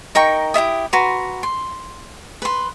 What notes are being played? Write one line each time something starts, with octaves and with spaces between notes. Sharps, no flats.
D#4 A#4 G5 C#6
E4 G4 E5 D#6
F#4 B4 A#5 C6
C6
B4 C6